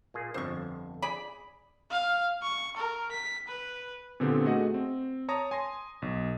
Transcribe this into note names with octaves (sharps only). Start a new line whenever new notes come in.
A#2 A#3 G#4
G1 F2 D3 C5 C#6
G#4 D5 B5
F5
C#6
A#4
B6
B4
A#2 D3 B3 C4 G4 A4
A3 F#4 G#4 D#5 F#5
C4
C#5 A5 A#5 C#6 D#6 A#6
G#5 C6 A#6
B1